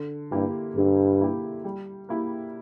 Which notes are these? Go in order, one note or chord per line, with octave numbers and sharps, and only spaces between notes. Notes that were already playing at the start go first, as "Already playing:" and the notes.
Already playing: D3
G2 A#3 E4 G4
G2 D3
A#3 E4 G4
G3
A#3 E4 G4